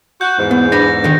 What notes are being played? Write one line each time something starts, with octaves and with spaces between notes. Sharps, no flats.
F#4 G6
E2 G#2
B3
D4 B4 B5 A#6
D3 D#3